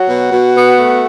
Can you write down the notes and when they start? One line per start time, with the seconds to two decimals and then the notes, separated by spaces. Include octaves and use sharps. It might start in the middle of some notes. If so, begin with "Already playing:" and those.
Already playing: F#3 F#4
0.09 B2
0.32 B2
0.56 B3
0.78 A3